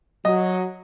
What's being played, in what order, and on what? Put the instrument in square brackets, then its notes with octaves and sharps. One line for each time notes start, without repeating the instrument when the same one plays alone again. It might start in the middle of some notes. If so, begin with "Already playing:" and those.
[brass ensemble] F#3 [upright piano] D#5